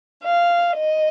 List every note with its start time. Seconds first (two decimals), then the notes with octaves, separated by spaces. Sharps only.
0.24 F5
0.76 D#5